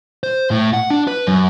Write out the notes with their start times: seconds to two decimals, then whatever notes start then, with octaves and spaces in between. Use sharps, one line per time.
0.23 C5
0.51 A2
0.73 F#5
0.90 D4
1.08 B4
1.27 F#2